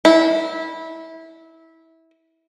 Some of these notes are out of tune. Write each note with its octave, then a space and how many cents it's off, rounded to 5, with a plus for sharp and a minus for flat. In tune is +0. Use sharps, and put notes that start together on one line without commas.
E4 -20